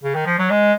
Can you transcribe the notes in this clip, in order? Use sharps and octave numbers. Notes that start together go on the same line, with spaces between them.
C#3
D#3
F3
F#3
G#3